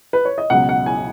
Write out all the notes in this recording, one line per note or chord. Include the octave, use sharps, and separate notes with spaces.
B4
C#5
D#5
C#2 B2 F#3 F#5
F#5
G#5